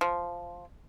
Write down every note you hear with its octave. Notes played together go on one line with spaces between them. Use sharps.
F3